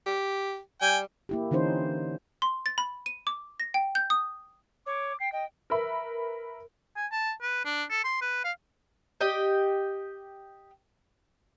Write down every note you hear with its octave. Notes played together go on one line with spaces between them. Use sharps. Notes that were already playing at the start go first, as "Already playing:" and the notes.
G4
G3 G5 G#5
A#3 E4 G4
D3 E3 C#4 D#4 C5
C6
A6
B5
D#7
D6
A#6
G5
G6
D#6
C#5 D6
G5 C7
D#5 G5
A#4 B4 E5 B5
G#5
A5
B4
D4
A4
C6
B4
F5
G4 D#5 G5